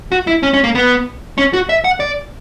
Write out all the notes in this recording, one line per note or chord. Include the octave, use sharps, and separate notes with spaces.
F#4
E4
C#4
C#4
A#3
B3
C#4
F#4
E5
F#5
D5